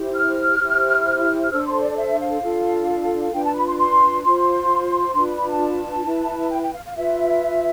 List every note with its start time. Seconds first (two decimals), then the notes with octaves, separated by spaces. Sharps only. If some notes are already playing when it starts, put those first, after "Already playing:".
Already playing: E4 G4 C5
0.15 F6
0.60 E4 G4 C5
1.51 D4 A4 C5 E6
1.66 C6
1.81 D5
1.97 E5
2.19 F5
2.42 D4 F4 A4
3.32 D4 F4 B4 G5
3.44 A5
3.55 B5
3.67 C6
3.78 C6
4.24 F4 C5 C6
5.14 D4 F4 B4 C6
5.26 B5
5.37 B5
5.49 A5
6.05 E4 B4
6.51 G5
6.62 G5
6.74 F5
6.85 F5
6.96 F4 B4 E5